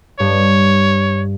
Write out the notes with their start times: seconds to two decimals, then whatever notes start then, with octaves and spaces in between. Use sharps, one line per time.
0.20 G2 C#5